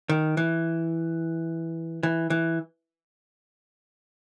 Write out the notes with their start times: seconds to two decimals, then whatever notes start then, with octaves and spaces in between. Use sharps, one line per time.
0.09 D#3
0.37 E3
2.03 E3
2.30 E3